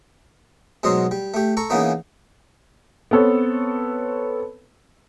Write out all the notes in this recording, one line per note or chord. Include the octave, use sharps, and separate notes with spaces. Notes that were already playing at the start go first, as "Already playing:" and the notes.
G#2 B2 F#3 D#5 C6
G3
A3 G4
A4 A#5 C#6
C#3 E3 A#3 B3 D#4
B3 C4 A4 C#5